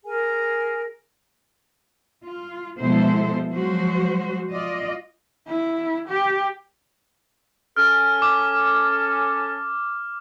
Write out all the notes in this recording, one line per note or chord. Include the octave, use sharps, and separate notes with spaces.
G#4 A#4 G#5
F4
B2 F3 G#3 E4 A4 C5
F3 F#3 G#3 F#4 C5
F4 D5 D#5
E4
G4
C#4 A4 F6
D6